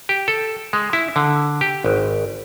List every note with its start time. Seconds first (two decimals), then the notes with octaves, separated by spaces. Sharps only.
0.09 G4
0.28 A4
0.73 G#3
0.93 E4
1.16 D3
1.61 G4
1.85 G#1